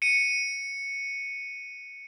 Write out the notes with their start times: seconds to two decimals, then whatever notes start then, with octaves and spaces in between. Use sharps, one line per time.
0.02 C#7 D#7